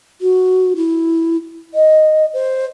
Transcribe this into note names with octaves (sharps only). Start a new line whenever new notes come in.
F#4
E4
D#5
C5